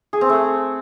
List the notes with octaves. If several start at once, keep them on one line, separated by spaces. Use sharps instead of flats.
G#4
C4
A3